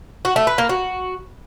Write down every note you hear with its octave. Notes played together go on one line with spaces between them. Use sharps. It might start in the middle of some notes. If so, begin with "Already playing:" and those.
F#4
A3
B4
A#3
F#4